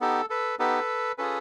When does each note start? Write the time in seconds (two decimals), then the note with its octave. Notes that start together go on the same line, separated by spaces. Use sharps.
0.01 B3 D#4 G4 A4
0.30 A4 B4
0.59 B3 D#4 G4 A4 B4
1.18 C#4 F4 G#4 A4 B4